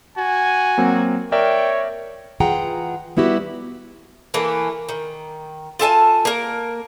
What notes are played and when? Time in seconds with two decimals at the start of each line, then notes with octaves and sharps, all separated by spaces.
0.18 F#4 G#5
0.78 F#3 A#3 C4
1.32 A#4 C#5 D5 E5 G5
2.40 E3 F4 G#4 F#5 G5 A#5
3.17 G3 B3 E4 F#4 G4
4.34 E3 A3 A#3
4.89 D#3
5.79 F4 A4 G#5 A5
6.25 A#3 A#4